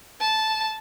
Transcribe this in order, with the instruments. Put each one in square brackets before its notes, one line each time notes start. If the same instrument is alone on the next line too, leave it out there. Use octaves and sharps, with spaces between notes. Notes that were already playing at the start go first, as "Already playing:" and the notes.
[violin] A5